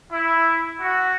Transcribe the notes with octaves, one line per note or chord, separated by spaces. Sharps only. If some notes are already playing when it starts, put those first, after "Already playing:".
E4
F#4